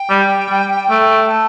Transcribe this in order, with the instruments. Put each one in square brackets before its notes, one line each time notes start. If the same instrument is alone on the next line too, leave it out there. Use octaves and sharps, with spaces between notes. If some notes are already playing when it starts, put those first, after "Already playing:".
Already playing: [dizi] G5
[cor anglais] G3
G3
A3
[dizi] A5